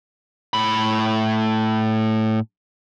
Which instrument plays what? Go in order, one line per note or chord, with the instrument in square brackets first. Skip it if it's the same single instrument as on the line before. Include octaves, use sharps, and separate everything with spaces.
[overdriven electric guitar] A2 B5